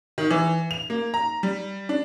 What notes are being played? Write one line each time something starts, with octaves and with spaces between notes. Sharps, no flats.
D#3
E3
F7
A#3
A#5
G3
D4